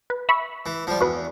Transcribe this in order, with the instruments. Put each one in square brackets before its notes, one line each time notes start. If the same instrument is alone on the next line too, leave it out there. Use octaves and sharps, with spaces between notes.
[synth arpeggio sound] B4
E5 B5 C#6
[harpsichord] E3
F3 G3
[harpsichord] E2 [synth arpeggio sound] F#4 B4